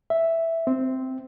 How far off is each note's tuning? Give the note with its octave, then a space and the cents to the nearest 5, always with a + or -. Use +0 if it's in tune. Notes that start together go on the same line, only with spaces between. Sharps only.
E5 +0
C4 -5